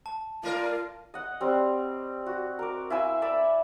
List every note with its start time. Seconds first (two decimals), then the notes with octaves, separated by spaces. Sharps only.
0.06 A5
0.43 A3 F4 A#4 D5
1.14 D#5 F#5
1.41 G3 C4
2.26 F#4
2.59 A#4 D6
2.90 E4 F5 G#5 E6
3.22 D5 E5 B5